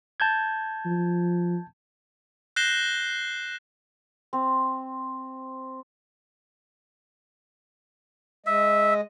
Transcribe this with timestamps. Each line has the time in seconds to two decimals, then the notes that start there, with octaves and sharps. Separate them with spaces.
0.20 A5 G6 G#6
0.86 F3
2.56 F#6 G6 A#6 C7 E7 G7
4.33 C4
8.46 G#3 D#5 E5